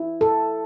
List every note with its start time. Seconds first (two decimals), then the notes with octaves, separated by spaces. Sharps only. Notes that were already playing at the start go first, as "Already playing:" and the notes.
Already playing: E4
0.21 A4